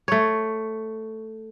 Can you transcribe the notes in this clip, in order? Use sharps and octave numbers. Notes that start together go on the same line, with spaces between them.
A3 C#5